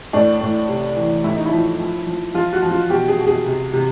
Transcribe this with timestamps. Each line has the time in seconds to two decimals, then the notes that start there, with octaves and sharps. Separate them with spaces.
0.13 A2 D4
0.41 A2
0.69 C3
0.96 E3
1.24 A2 E4
1.35 D#4
1.46 E4
1.52 F3
1.80 F3
2.07 F3
2.34 F3 F4
2.53 F#4
2.62 F3
2.71 F4
2.90 B2 G4
3.08 G#4
3.17 B2
3.27 G#4
3.45 C3
3.73 C3